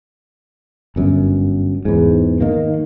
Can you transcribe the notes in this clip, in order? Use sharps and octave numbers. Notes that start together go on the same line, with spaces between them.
G1 F#2
E2 G#2
D#3 A#3